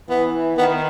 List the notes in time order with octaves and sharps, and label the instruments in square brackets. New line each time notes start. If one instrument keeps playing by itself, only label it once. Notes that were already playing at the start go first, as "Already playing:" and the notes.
[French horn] E3 [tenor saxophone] B3
[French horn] D#3 [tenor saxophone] B3